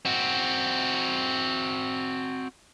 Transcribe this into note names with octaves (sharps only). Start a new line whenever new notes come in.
C4 F#4